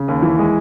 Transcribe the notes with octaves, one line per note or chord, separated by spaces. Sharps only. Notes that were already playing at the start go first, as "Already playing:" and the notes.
Already playing: C#3
D#2
E3
G#3